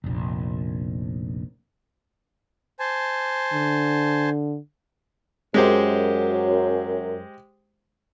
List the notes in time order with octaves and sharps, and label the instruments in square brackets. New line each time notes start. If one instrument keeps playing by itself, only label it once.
[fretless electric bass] F1 A#1
[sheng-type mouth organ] C5 G#5 A5
[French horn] D3
[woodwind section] F#2 [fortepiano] G#3 G4 C5